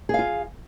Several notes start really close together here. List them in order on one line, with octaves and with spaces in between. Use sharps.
G#4 F5 F4